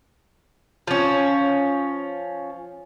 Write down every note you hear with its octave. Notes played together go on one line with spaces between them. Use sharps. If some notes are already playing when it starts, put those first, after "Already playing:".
F3 C#4